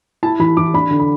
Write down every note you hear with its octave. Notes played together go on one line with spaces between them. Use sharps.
E4 A5
E3 B5
E3 D6
D4 B5
D3
B5